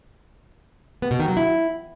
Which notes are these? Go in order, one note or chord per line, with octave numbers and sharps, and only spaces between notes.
B3
B2
D#3
F#3
E4